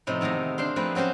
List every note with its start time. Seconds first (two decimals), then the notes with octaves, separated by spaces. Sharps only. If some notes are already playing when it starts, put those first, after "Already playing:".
0.07 A2 C3 F3 D#4
0.21 E2 D#3 A3 G#4 A#5
0.58 D4 C5 F5 C6
0.76 F3 A3 C4 G#4 A#4 B4
0.95 F#3 C4 C#4 G4 C5